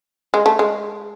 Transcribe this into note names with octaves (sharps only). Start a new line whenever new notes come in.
G#3
A3
G#3